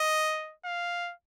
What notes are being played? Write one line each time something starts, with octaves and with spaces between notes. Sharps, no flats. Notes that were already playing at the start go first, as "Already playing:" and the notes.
Already playing: D#5
F5